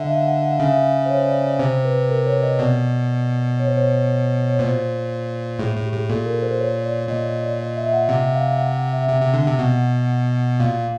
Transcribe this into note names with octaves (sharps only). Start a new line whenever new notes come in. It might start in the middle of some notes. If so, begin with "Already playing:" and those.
Already playing: D3 D#5 E5 F#5
F5
F#5
F#5
F5
C#3 E5
F5
C5
C#5
D5
D5
C3 C5
B4
A#4
C#5
D#5
B2 D5
C#5
C5
C#5
C#5
A#2 C5
A2 G#4
A2
G4
A2 G#4
A#2 A4
A#4
C5
C#5
D5
A#2 D#5
D#5
D5
D#5
E5
F#5
C3 F#5
F5
F5
F#5
F#5
E5
C3
C3
D3
C3
B2 F#5
A#2 F5